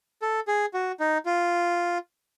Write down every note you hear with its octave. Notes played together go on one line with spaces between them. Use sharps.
A4
G#4
F#4
D#4
F4